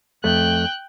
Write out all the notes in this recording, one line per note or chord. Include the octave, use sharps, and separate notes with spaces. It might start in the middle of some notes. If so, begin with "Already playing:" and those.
F2 A3 G5 F#6